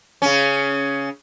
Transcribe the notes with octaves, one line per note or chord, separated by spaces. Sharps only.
C#3 C#4